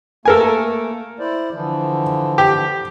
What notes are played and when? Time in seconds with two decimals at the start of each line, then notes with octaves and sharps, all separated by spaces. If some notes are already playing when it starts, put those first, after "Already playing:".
0.25 A3 A#3 A4 A#4 G#5
1.19 E4 C5 D5
1.53 D3 E3 F3
2.38 G4